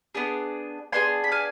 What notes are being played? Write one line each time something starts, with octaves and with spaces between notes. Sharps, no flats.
B3 D4 G#4
B3 D4 G#4 G#5 C6
B5
F5 G#5